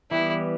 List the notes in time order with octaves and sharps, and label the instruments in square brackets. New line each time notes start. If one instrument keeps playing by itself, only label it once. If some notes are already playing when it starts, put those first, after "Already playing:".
[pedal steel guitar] E3 G3 B3 G4 [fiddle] E4